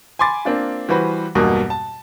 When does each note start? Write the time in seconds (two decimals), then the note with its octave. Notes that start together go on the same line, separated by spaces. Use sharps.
0.19 G#5 B5 C6 D6 A6
0.45 A#3 C4 D4 F4
0.89 E3 G3 F#4 B4 C5
1.35 B1 E2 G2 B2 A#3
1.70 A5